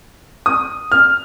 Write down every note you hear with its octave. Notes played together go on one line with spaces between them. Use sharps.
D#6
F6